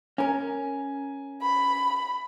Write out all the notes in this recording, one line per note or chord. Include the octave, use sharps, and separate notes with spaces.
C#4 A#4 G#5
B5